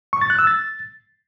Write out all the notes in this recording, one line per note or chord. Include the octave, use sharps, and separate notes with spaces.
C#6
A6
F#6
E6
A6